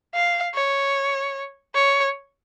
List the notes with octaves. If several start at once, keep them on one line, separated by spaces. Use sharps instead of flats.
F5
C#5
C#5